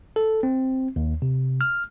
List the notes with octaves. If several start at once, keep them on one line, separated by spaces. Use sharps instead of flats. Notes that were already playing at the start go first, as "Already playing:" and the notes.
A4
C4
D#2
C3
F6